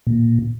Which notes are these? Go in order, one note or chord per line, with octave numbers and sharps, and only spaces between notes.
A#2